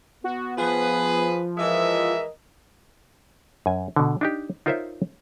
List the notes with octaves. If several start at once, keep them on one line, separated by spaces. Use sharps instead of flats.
B3 F#4
F3 G#4 B4
E3 G#3 A#4 D#5 E5
F#2 G#5
B2 D3
D4 D#4 G4
D#4 F4 A#4 C5 C#5 E5